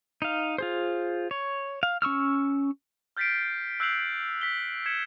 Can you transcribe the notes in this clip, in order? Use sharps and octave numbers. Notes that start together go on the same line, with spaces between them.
D#4 F5
F4 G#4 C5
C#5
F5
C#4 C#6 E6 F6
F6 G6 A6 B6 C7 D7
E6 F#6 G6 C7 F7 F#7
B6 G7
G#6 B6 C#7 E7